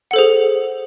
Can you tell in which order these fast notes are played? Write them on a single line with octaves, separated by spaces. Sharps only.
F#5 A4 C5 G#4